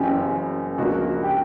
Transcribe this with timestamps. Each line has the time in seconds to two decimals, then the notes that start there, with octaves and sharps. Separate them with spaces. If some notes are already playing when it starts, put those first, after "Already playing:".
Already playing: F#1 F#2 C#3 E3 G4
0.78 C#2 C#3 F3 A#3 D4 F#4
1.23 G4